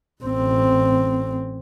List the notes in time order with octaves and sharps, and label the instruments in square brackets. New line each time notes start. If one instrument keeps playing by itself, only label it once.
[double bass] A1 C4